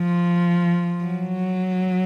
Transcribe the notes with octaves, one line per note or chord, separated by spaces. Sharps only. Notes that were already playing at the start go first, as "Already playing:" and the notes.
Already playing: F3
F#3